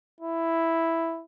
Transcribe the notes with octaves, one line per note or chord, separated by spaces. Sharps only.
E4